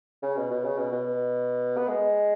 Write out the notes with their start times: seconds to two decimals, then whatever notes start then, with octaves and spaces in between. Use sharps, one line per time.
0.23 C#3
0.37 B2
0.51 B2
0.64 C#3
0.78 B2
0.92 B2
1.77 B3
1.88 G#3